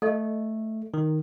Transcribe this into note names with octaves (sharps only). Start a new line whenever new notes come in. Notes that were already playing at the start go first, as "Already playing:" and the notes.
A3 A4 D#5
D#3